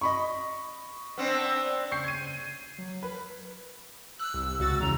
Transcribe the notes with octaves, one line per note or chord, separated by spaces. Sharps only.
D#5 B5 C#6
B3 C4 D4
C#3 C#6 G6 C7
G#6 D#7
C7
F#3
A#4 B4
E6 F#6
C2
C#2 F#4 A6
E2 C#3 A#5